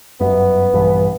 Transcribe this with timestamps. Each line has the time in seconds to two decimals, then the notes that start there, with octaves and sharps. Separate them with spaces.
0.21 G1 F#2 B3
0.73 A#1 G2 E3